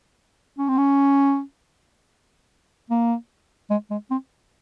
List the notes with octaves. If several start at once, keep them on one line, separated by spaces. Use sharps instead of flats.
C#4
C4
C#4
A#3
G#3
G#3
C4